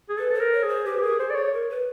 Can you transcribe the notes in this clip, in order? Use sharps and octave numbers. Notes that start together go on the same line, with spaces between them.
G#4
A4 B4
A4 C5
A#4
C#5
G#4 C5
G4 B4
G4
G#4 A#4
A4 C5
D5
G#4 C#5
A#4
B4